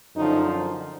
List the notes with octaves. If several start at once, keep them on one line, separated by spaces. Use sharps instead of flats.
F#2 D3 F3 D#4